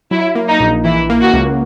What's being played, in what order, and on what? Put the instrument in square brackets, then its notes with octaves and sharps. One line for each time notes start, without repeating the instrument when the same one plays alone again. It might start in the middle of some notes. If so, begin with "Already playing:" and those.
[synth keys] F#3 [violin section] E4
[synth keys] A#3
[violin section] D#4
[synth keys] A#1
[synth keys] E3 [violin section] E4
[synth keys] A#3
[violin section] F#4
[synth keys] C#2